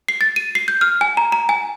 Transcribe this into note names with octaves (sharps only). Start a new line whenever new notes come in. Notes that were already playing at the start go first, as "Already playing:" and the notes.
C7
A6
D#7
C7
G6
F6
G#5
A#5
A#5
G#5